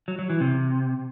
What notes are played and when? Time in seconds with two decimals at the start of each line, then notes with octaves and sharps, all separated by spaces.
0.08 F#3
0.19 F#3
0.30 E3
0.40 C3